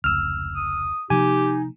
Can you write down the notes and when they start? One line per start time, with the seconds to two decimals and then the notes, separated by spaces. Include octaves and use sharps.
0.04 F1 C#2 E6 F6
0.55 D#6
1.10 C3 F3 A#3 D#4 G4 G#5